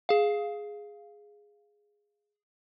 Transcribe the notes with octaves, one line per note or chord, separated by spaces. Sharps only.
G#4 F5